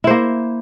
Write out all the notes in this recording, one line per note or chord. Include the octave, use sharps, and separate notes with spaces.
A#3 E4 C5